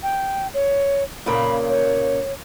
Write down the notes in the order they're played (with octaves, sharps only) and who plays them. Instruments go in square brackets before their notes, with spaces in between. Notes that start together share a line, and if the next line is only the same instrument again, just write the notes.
[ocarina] G5
C#5
[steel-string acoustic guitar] A#2 C#3 A#3 [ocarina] B5
[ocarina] C#5